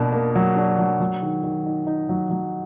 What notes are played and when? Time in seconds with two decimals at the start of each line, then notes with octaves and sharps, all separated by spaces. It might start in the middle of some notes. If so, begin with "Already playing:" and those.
Already playing: B2 A#3 D4
0.13 A#3
0.35 F#3
0.56 D4
0.79 F#3
1.00 F#3
1.22 D#3
1.43 D#3
1.66 D#4
1.87 D#4
2.09 F#3
2.30 F#3